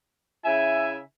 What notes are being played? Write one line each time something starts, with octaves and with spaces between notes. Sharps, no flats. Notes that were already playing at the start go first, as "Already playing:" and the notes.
C#3 E4 E5 G#5